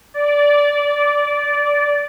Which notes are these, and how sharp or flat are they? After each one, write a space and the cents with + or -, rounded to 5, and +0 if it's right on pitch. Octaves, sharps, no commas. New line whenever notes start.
D5 -15